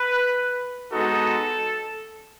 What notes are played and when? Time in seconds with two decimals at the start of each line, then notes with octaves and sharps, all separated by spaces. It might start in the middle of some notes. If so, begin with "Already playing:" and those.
Already playing: B4
0.91 G#3 B3 D#4 F#4 A4